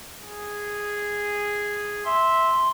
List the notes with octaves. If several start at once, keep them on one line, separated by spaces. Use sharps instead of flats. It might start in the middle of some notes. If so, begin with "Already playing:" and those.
G#4
E5 C6